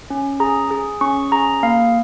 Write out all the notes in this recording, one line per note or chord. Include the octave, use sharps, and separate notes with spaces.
C#4
G#4 A#5
G#4
C#4 C#6
G#4 A#5
A#3 F5